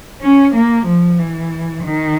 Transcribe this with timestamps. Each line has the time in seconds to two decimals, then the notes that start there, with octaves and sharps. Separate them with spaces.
0.22 C#4
0.54 A#3
0.86 F3
1.19 E3
1.83 D#3